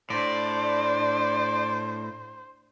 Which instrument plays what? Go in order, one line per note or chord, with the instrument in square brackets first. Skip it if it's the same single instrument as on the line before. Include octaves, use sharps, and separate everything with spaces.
[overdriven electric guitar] A2 [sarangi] D4 [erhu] C5 [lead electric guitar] D5